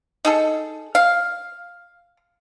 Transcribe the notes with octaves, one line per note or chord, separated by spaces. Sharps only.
D#4 G#4 A4
F5